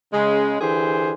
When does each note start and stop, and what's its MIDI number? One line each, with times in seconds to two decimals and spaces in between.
0.12 0.57 49
0.12 0.57 56
0.60 1.13 50
0.60 1.13 52
0.60 1.13 67
0.60 1.13 68
0.60 1.13 72